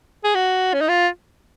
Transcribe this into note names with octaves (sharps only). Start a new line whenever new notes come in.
G#4
F#4
C#4
D#4
F4